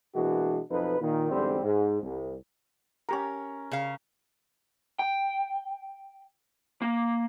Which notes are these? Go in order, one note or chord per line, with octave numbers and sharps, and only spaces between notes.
B2 E3 G#3 A#3 D4 F#4
B1 F2 D#4 B4
A#2 D#3
E2 G#2 D3 G3 C4
G#2
C2
C#4 G4 A#4 A#5
C#3 F5
G5
A#3